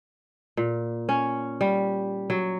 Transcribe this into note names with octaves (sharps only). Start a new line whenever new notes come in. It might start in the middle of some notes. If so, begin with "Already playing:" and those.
A#2
C#4
G3
F#3